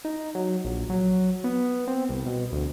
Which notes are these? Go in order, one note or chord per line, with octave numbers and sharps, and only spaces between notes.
D#4
F#3
A#1
F#3
B3
C4
C2
B2
D2